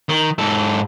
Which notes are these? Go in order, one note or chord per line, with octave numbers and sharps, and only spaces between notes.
D#3
G#2 A4